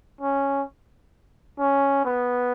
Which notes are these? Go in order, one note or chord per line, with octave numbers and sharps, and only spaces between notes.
C#4
C#4
B3